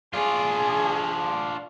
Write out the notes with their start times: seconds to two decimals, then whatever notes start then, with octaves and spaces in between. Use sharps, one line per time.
0.14 D4 F4 G#4